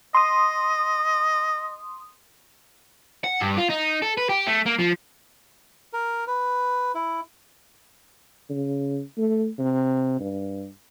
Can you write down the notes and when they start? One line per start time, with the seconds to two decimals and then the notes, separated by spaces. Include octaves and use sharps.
0.15 D#5 C6 D#6
3.24 F#5
3.40 G2
3.57 F4
3.69 D#4
4.02 A4
4.17 B4
4.29 G4
4.47 A3
4.66 A#3
4.79 F3
5.93 A#4
6.27 B4
6.95 E4
8.50 C#3
9.17 A3
9.59 C3
10.20 G2